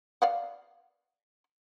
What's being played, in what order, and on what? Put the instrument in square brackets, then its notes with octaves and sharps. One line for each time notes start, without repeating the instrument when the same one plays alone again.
[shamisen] D5 F5 F#5